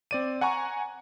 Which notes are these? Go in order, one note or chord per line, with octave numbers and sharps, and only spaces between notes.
C4 D5 D#7
F#5 G#5 A#5 C#6